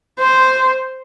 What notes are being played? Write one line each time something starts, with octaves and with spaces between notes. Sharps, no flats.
C5